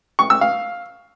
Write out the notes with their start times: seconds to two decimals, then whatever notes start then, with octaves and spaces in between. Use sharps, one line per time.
0.19 C#6
0.30 E6
0.41 F5